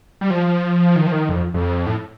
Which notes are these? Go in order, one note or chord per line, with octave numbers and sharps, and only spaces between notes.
G3
F3
D#3
F3
D#3
F2
F2
A2